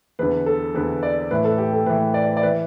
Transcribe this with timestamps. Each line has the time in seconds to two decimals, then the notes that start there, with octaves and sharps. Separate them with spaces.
0.19 E2 D3 B4
0.46 A4
0.74 E2 D3 B4
1.03 D5
1.31 A2 E3 B4
1.45 A4
1.58 G4
1.73 A4
1.86 A2 B4
1.90 E3
2.14 D5
2.37 D5
2.43 E3 B4